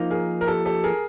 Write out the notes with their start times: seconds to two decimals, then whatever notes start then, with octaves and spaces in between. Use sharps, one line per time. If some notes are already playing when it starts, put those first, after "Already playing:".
Already playing: F3 A#3 D#4
0.10 G#4 A#4
0.41 A#4
0.47 G4 A4
0.65 G4 A4
0.84 G#4 A#4